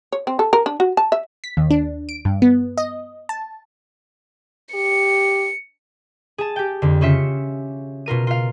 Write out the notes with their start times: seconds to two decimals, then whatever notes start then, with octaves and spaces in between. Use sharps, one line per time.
0.12 C#5
0.27 C4
0.39 A4
0.53 A#4
0.66 D4
0.80 F#4
0.97 A5
1.12 E5
1.44 B6
1.57 D#2
1.71 D4
2.09 D7
2.25 G2
2.42 B3
2.78 D#5
3.29 A5
4.74 G4 C#7
6.38 G#4 A5
6.56 G4 G5
6.82 F2 D3
7.01 C#3 C#4 F4 E5 C#7
8.06 B2 F4 A#4 D#7
8.27 F4 F5